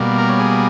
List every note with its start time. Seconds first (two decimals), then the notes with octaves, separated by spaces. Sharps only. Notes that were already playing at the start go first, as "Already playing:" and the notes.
Already playing: B2 G3 A#3
0.18 A#4
0.29 C#5
0.39 G#4